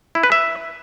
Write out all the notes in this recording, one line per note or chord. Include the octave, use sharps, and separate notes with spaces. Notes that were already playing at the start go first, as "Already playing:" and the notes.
E4
B4
E5